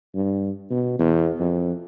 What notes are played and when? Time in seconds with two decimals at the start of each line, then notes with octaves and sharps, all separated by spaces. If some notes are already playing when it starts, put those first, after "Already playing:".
0.14 G2
0.70 B2
0.99 E2
1.40 F2